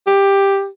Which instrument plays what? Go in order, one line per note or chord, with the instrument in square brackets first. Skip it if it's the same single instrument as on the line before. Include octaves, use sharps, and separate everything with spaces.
[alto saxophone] G4